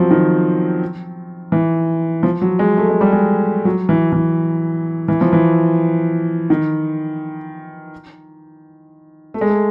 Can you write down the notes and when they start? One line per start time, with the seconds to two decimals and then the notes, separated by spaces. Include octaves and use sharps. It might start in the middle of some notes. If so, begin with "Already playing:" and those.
Already playing: F3 F#3 C4
0.11 D#3
1.52 E3
2.23 F3
2.42 F#3
2.59 G#3
2.77 A3
2.89 G#3
3.01 G3
3.12 G#3
3.65 F#3
3.89 E3
4.12 E3
5.08 E3
5.21 F3
5.33 E3
6.50 D#3
9.34 A3
9.41 G#3
9.49 A3